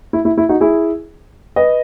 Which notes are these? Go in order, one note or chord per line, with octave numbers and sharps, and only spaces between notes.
E4
E4
E4
D#4 F#4
E4 G#4
B4 D#5